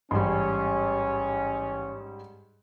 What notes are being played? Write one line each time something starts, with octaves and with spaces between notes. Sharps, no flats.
A1 G#2 G3 C#4 C6